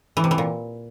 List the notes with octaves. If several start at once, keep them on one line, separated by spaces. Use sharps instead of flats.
E3
C3
E3
A#2